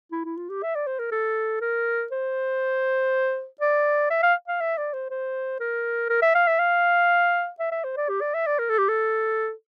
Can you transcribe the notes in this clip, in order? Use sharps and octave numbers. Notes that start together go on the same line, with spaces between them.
E4
E4
F4
G4
E5
D5
C5
A#4
A4
A#4
C5
D5
E5
F5
F5
E5
D5
C5
C5
A#4
A#4
E5
F5
E5
F5
E5
E5
C5
D5
G4
D5
E5
D5
A#4
A4
G4
A4